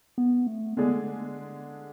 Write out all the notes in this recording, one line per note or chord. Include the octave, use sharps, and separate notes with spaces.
B3
A3
D3 G#3 B3 D4 G#4